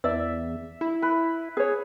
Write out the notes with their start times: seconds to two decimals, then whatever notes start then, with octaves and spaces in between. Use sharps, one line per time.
0.04 E2 D5 E5
0.81 E4
1.02 B4
1.57 G#4 C#5